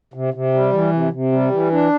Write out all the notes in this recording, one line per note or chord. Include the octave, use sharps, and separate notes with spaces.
C3
C3
G3
E3
C3
C3
G3
E3
D4